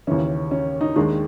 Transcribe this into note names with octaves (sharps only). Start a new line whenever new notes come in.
D#2 C#3 E3 C#4
C#4
D#4
D#2 D#3 G#3 D4